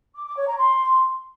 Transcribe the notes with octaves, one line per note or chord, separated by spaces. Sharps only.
D6
D6
C#5
A#5
C6